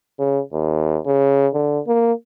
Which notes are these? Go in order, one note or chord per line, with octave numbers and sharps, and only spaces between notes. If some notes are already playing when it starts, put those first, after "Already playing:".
C#3
D#2
C#3
D3
A#3